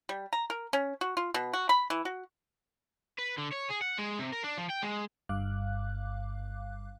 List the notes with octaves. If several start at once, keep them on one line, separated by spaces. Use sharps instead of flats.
G3
A#5
A#4
C#4
F#4
F4
B2
F#4
B5
E3
F#4
B4
D3
C#5
G#4
F#5
G#3
C3
A#4
D4
F3
G5
G#3
G1 G2 F5 D6 F#6